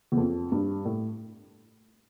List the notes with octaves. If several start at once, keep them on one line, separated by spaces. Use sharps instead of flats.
E2
F2
G2
A2